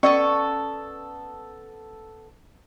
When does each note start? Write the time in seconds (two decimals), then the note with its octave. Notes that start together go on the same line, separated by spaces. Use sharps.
0.03 B3 C#4 A4 D5 C#6